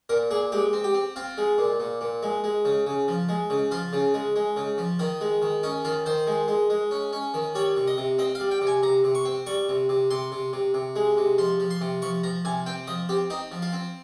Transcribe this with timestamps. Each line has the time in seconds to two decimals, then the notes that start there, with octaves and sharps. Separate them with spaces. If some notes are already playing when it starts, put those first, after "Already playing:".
0.09 A#2 A#4
0.31 A#2 G#4
0.52 G#3 G4
0.73 C4
0.84 G4
0.94 C4
1.16 C4 F4
1.38 G#3
1.58 A#2
1.80 A#2
2.01 A#2
2.23 G#3
2.44 G#3
2.65 C#3
2.87 C#3
3.08 F3
3.29 G#3
3.50 C#3
3.71 F3 F4
3.93 C#3
4.14 G#3
4.36 G#3
4.56 C#3
4.78 F3
4.99 D#3 D#4
5.21 G#3
5.42 D#3
5.63 C#4 D#4
5.85 D#3 F4
6.06 D#3 C5
6.27 G#3
6.48 G#3
6.70 G#3
6.91 C#4
7.13 C#4
7.34 D#3
7.55 G3 C#5
7.77 C3
7.88 D#5
7.97 C3
8.18 C4 D#5
8.35 F5
8.40 G3
8.51 G5
8.61 C3
8.67 G#5
8.83 C3 A#5
9.04 C3
9.15 C#6
9.25 C4
9.46 G3 C#6
9.69 C3
9.89 C3
10.11 C3 C6
10.32 C3
10.53 C3
10.74 C3
10.96 G#3
11.17 C3
11.38 F3 C6
11.60 F3
11.70 C6
11.81 C3
12.02 F3 C#6
12.24 F3 A#5
12.45 C3 G#5
12.66 C4 G5
12.87 F3 D#5
13.09 C4 G4
13.30 C4 D#4
13.52 F3
13.62 F4
13.73 C4